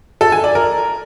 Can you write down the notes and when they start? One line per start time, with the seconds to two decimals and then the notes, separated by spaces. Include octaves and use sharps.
0.21 A4
0.32 G#5
0.44 D5
0.55 A#4